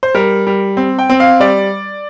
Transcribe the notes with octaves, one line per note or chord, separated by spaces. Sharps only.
C5
G3 A#4
G3
C4
G5
C4
F5
G3 D5